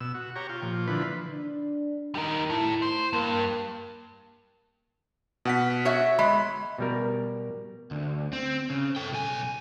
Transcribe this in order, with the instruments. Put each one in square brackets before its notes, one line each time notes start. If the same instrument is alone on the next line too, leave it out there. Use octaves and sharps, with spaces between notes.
[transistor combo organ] B2 E6
F#4
G4 C#5 A#5
F4 G5
A#2 F3
D3 E3 F3 B4
[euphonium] D4
[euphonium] D#3 [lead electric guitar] G3 D#4
[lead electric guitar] A2 [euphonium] E4
[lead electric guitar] C5
[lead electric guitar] G2 [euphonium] A#3
[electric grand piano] B2 F#5 B6
[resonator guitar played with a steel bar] F#4 C#5 E5
[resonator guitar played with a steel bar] G#3 [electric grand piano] B5
[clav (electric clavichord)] B2 G3 A#4
[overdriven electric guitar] D2
C4
C#3
A4 G5
B1 G#5